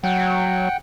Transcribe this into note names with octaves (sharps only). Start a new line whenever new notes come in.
F#3 F#5 G5